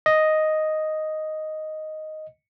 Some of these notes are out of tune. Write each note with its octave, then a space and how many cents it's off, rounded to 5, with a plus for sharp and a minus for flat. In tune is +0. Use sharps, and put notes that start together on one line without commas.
D#5 +0